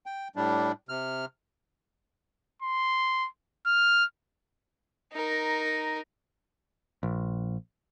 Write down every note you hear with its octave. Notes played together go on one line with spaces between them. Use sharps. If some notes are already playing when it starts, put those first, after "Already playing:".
G5
A2 G3 D4
C3 F6
C6
F6
D#4 A#4
A#1